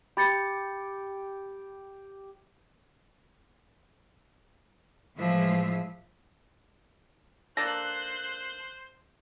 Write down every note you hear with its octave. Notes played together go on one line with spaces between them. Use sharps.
G4 B5 A6 C#7
A2 E3 F3 G#3 E5
A#3 D4 A4 C5 F#6 A#6